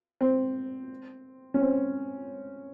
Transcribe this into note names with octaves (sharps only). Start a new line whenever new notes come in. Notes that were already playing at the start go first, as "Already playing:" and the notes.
C4
C#4
C4